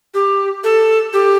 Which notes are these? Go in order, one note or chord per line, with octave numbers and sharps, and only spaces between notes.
G4
A4
G4